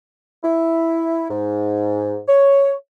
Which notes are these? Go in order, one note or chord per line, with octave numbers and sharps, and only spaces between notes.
E4
G#2
C#5